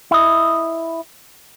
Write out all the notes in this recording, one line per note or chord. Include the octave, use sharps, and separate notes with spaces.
E4 D#5